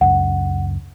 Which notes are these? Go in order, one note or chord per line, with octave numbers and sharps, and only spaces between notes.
C#2 F#2 F#5